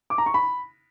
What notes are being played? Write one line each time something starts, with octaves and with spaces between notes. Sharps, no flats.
D6
A#5
C#6
B5